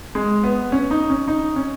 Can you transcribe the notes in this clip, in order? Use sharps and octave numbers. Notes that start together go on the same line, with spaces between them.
G#3
B3
C#4
D#4
C#4
D#4
C#4